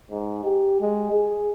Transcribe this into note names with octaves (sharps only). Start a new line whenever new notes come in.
G#2
G4
G#3
G#4